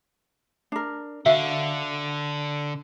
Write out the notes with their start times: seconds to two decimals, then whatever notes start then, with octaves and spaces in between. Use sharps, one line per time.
0.72 D4 A#4
1.26 D3 F#4 E5 F5